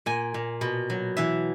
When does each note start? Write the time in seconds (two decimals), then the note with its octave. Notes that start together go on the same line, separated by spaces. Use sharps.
0.06 A#2 G#5
0.34 A#2
0.61 B2
0.90 F#3
1.17 E3 E5